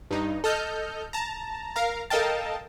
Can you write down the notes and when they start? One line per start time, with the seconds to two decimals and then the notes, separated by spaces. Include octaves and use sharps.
0.11 G2 D#4
0.44 A4 D#5 F6 G6
1.13 A5 A#5
1.76 A#4 F5 A#5
2.10 A4 A#4 D#5 F5 G5 A5